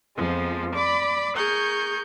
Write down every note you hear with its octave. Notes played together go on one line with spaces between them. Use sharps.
F2 F3 G#3 B3
D5 B5 D6
G#4 A#4 C#6 G6